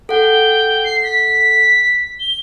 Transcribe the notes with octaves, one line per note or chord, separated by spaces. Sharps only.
A4 F#5 G5
C7
B6
G7